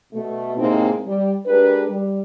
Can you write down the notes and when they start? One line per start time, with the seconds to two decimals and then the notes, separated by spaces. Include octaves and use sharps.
0.13 B2 A3
0.56 A2 C3 G#3 A#3 C4 D#4
1.06 G3
1.47 G#3 D4 G4 A#4 B4
1.89 G3